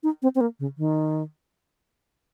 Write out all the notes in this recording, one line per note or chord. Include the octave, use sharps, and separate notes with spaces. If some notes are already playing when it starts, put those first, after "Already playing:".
D#4
C4
C4
A#3
C#3
D#3